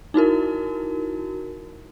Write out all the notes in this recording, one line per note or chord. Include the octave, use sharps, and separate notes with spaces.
D#4 E4 F#4 A#4